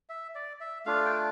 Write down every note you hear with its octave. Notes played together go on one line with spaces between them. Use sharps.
E5
D5
E5
A3 D4 F4 F5
G5